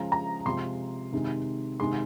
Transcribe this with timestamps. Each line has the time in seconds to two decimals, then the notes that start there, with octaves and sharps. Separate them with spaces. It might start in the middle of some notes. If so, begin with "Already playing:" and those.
Already playing: C#3 F3 G#3 A#5
0.12 A#5
0.46 C3 F3 G#3 C6
1.12 C3 D#3 G#3
1.80 C3 D#3 G#3 C6